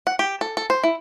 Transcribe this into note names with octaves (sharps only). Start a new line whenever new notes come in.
F#5
G4
A4
A4
C5
E4